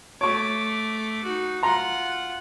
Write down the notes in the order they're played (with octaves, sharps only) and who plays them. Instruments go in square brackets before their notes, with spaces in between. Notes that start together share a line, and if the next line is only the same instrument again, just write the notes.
[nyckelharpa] A3 D6 [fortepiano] C#5 C#6
[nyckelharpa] D#4 F#4
[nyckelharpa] F4 F#5 [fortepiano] A#5 C6